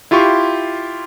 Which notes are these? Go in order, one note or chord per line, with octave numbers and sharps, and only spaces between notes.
E4 F4 G4 C6 C#6